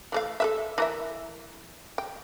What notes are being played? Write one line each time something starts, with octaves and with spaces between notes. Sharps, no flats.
E3 A3 F5
A4 B4 E5
E3 A#4 E5
G5